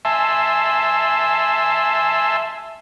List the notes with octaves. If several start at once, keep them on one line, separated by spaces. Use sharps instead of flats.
E5 G#5 A5 C6 E6